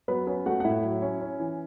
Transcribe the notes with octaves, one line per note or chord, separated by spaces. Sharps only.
F#3 B3 B4
B3 C#4 B4
A3 F#4 F#5
F#5
A2 E4 E5
F#3
C#4
C#4
E3